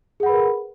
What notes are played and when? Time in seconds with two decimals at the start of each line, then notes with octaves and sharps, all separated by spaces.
0.20 G#4
0.23 F#5
0.26 B5
0.29 B4
0.32 A#4